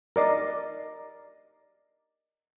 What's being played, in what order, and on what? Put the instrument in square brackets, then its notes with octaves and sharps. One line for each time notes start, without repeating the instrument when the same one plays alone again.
[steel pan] A#4 D5 D#5